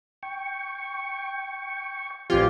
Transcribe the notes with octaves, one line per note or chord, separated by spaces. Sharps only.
G5 C#6
A1 F3 C4 F4 G4 G#5